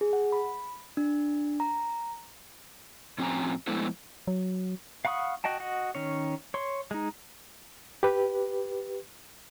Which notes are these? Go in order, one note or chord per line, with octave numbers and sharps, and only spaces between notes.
G#4
F#5
B5
D4
A#5
A2 F3 C4 C#4 G#5 A#5
F3 G#3 A3 B3 E4 C5
F#3
F5 F#5 B5 C#6 D#6
F#4 D#5 G5 A5
F#4 D#5 F#5
D#3 C#4 C#5
C#5 C6
G#3 D#4
G4 B4